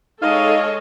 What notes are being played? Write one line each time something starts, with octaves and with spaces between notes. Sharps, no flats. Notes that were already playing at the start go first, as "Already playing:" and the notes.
G#3 D#4 A4 C#5 D#5 F5